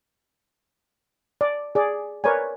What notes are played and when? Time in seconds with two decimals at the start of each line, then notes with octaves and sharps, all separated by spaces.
1.41 D5
1.75 G#4 D5
2.24 A#4 B4 C#5 D5 G#5